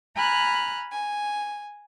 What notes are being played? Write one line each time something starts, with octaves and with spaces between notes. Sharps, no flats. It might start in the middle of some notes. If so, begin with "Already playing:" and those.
G#5 A#5 B5 F6 F#6
G#5